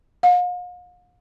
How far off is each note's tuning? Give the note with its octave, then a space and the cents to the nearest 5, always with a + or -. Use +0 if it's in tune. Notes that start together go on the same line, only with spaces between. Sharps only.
F5 +45